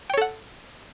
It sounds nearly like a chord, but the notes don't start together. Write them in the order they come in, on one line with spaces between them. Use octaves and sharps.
G5 C#5 A4 F#5